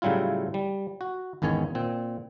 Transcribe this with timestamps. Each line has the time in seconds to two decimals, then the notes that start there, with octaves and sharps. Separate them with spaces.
0.02 A2 C#3 F#3 G3 E4 F4
0.54 G3
1.01 F#4
1.42 G#1 E2 D#3 C#4 C#5
1.75 A#2 C4